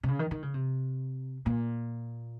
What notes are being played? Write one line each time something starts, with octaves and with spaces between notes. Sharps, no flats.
C3
C#3
D#3
D#3
C#3
C3
A#2